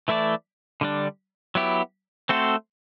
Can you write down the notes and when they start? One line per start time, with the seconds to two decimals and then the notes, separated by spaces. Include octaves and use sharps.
0.08 E3 A3 E4 A4 D5
0.81 D3 G3 D4
1.55 F#3 B3 E4 G4
2.29 A3 C4 F#4 A4 C5